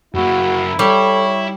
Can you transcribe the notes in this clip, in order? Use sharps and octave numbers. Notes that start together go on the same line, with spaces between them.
F#2 A#3 E4 F#4
G3 E4 A4 C#5